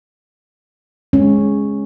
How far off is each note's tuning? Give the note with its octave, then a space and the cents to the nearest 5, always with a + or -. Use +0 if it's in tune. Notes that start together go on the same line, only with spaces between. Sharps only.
G#3 +0 C#4 -5